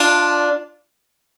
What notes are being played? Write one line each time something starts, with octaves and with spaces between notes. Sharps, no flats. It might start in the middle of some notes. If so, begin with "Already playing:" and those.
Already playing: D4 F4